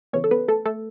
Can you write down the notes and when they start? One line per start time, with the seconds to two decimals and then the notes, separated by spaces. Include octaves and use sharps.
0.13 C#3 E3 B3 C#4 C#5
0.24 A4
0.31 B3 B4
0.48 A3 A4
0.66 A3 A4